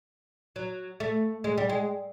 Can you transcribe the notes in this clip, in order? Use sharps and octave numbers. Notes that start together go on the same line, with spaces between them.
F#3
A3
G#3
G3
G#3